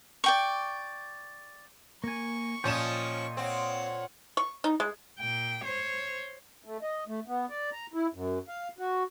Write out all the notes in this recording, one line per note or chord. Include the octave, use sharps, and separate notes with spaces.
D5 G5 C#6
A#3 G#5 C#6
A#2 F3 C#4 D#5 G5 E7
C4 C#5 F#5
C#6
D#4
G#3
A#2 G5
C5 C#5
A3
D#5
A3
B3
D5
A#5
E4
F#2
F5
F#4